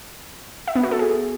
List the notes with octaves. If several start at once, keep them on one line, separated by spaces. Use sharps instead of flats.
E5
B3
F#4
A4
G#4